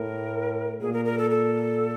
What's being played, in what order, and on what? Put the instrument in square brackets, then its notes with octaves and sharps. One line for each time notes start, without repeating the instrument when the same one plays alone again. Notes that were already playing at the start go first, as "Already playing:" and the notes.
Already playing: [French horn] A2 [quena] A#4
[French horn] A#2 [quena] G#4
[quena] A#4
A#4
A4
A4